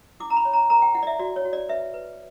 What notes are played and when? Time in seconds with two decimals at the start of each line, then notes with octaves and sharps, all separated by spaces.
0.20 E4 D6
0.30 A#5
0.37 B5
0.45 C#5
0.54 A#5
0.70 A#4 A#5
0.82 G5
0.95 E4 F#5
1.03 D5
1.07 E5
1.19 F#4 D5
1.36 C#5
1.45 F#4
1.53 D5
1.69 B4 E5
1.94 B4